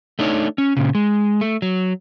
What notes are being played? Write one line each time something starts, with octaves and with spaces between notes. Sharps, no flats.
A3 D4 D#4 C#5
C#4
A#2 C#3
G#3
A3
F#3